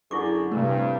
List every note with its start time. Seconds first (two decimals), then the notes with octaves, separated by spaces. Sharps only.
0.11 F#2 D3 E4 G#4 C#6 D6
0.52 G2 C3 A3